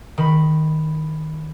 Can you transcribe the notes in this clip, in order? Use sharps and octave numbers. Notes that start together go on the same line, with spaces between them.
D#3 B5